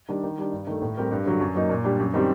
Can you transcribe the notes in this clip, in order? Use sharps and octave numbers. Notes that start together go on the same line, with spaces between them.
D#3 G3 D4
D#3
G3 D4
G2
D#3 A3
A2
G3 C4 G4 A#4
G2
D3 F#3
F#2
F#3 A#3 D#4
A#2
G3 D4 G4
F#2
D#3 G3 C4 G4